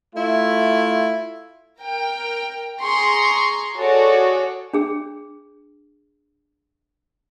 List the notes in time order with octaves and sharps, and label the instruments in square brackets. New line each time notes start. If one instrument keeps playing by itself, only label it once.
[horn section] A3 E4 F4
[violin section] A#4 G5
G#4 A#5 C6 C#6
F#4 G#4 A4 C#5 D5
[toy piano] D4 G#4